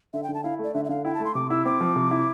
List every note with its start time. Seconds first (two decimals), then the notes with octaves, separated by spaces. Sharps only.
0.13 D3 E5
0.23 G5
0.29 D3
0.34 A5
0.44 E4 F5
0.59 A3 D5
0.74 D3 E5
0.85 E5
0.89 D3 F5
1.05 E4 G5
1.14 A5
1.20 A3 C6
1.35 C3 D6
1.50 E4 E6
1.65 C4 D6
1.81 F3
1.96 C3
2.11 E4